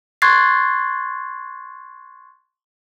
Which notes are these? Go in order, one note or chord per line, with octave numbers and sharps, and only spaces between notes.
C6 C#6 F#6 G#6 A6 C7